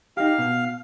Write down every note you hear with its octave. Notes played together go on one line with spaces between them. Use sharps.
D#4 G4 F5
B2